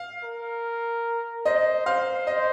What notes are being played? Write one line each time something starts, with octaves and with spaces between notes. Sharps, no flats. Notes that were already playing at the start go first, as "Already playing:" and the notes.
Already playing: F5
A#4
C5 D#5
C5 F5
D#5